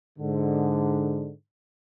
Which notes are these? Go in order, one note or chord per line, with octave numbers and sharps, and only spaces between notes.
G#2 D3